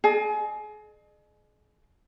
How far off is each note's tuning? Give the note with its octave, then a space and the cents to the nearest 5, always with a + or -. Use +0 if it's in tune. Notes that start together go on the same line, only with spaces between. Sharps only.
G#4 +35 D#5 -40